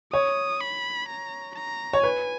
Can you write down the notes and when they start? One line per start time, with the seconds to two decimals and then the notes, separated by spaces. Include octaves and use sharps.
0.13 C#5 D#6
0.61 B5
1.09 A#5
1.56 A#5
1.93 C#5
2.03 B4 G#5